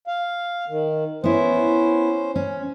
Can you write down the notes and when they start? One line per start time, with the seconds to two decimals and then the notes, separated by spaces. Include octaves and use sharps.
0.07 F5
0.69 D#3
1.24 B3 C#4 E4 C5
2.36 C#4